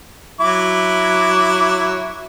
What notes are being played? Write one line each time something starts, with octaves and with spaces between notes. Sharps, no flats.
F#3 E4 D6